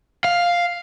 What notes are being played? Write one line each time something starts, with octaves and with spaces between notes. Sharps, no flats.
F5